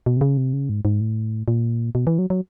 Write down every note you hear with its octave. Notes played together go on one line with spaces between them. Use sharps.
B2
C3
C#3
C3
C#3
G#2
G#2
A2
A#2
B2
E3
F#3
F#3